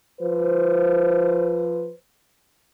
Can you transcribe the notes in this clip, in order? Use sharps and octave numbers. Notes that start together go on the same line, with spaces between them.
F3 B4 C5